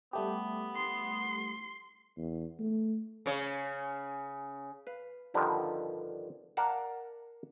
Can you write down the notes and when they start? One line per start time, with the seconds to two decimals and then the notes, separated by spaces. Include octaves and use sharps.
0.13 G3 A3 B3 G4
0.76 C6
2.18 E2
2.59 A3
3.26 C#3 C#5
4.87 B4 F5
5.34 G2 D3 D#3 F3 G3
6.57 A#4 D5 F5 F#5 A5